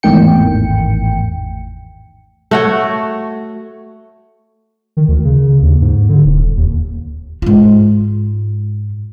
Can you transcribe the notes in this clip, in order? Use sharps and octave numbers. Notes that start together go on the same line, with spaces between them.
G#1 E2 A2 D#3 G5 C#7
A3 F#4 C#5
D#3
D2
C#3
D#2
G#2
D3
D#1
D#2
G#2 F4